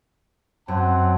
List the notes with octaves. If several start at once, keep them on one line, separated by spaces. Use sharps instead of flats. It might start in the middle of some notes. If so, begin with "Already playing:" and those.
F#2 C4 F#5 A5